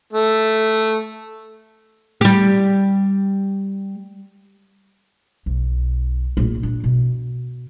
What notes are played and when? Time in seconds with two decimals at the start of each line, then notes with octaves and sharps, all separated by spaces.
0.13 A3
2.21 G3 G4
5.46 B1
6.37 A#1 A#2
6.63 D4
6.84 B2